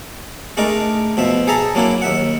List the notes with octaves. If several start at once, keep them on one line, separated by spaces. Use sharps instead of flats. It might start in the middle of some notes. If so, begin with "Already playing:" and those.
G#3 A3 D4 D#4 A#4
B2 F3 E5
G#4 A4 E5 A#5
F#3 A#3 D4 E4
D#2 E5 F#5